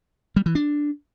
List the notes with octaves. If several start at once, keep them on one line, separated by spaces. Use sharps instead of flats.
G3
E3
D4